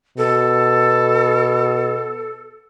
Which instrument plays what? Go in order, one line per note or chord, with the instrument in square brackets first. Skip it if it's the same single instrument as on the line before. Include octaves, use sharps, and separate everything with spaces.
[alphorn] B2 [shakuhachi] A4